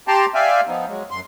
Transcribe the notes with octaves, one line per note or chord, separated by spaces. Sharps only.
G4 G5 A5 A#5 C6
D5 E5 F5 G5 G#5
F3 B3 D#4
F#3 G#3
F#2 C6